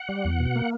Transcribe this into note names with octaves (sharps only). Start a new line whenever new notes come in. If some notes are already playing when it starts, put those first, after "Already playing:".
Already playing: F#5
G3
E2
B2
A#3